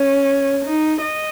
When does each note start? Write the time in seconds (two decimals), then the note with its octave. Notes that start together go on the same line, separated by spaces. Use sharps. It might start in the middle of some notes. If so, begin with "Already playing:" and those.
Already playing: C#4
0.65 D#4
1.01 D#5